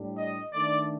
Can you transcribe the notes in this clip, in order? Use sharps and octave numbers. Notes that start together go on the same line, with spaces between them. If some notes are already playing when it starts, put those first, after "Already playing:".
Already playing: A2 G3 D4
D#5
D#3 A3 D4 D5